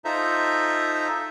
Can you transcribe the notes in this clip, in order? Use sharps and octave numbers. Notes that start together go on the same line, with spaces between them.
D#4 F4 A4 C5 E5 A#5